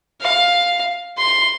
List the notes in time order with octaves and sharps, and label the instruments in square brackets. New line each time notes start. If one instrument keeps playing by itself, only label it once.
[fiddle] F5
C6